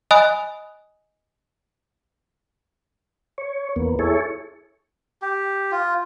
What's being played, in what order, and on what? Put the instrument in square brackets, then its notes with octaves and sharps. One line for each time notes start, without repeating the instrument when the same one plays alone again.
[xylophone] D#5 G#5 B5 D#6 F#6
[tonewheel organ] C#5
E2 A#3 B3
E4 G#4 A4 C#5
[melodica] G4
F4